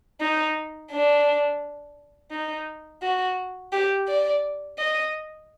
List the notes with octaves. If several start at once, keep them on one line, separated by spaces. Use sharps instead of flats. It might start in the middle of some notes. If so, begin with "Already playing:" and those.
D#4
D4
D#4
F#4
G4
D5
D#5